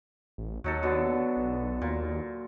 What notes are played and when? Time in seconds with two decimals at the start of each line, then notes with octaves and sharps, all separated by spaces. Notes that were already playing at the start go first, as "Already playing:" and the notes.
0.38 A1
0.64 D#2 F#3 D#4 A4
0.83 B2 D3 B3
1.37 B1
1.82 D#2 A#2